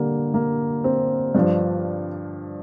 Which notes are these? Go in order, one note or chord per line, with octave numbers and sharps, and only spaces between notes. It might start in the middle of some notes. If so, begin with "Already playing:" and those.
Already playing: D3 G3 A#3
A#3
C4
G2 F3 D4